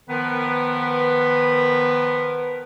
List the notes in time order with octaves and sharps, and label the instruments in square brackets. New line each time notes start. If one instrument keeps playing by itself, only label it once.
[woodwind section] D#3 F3 B3 A#4 B4